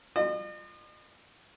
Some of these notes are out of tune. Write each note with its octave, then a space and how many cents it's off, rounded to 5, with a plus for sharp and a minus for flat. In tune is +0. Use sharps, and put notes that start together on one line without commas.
F4 -5 D#5 -45